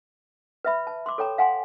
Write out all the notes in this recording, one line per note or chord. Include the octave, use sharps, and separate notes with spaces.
B4 E5 B5
A5
C6 D6
A4 C#5 G5 A#5
F5 F#5 G#5 A#5 C6